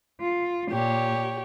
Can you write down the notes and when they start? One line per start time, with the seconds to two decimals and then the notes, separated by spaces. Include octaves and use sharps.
0.21 F4
0.72 A#2 G4 C#5